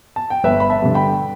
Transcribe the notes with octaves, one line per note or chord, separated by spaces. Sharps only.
A5
G5
G1 B4 E5
B5
E5 A5
G2 D3
G5 B5